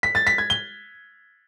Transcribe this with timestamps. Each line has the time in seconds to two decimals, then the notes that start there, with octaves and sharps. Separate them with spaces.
0.03 B6
0.15 A6
0.27 B6
0.38 G#6
0.50 G7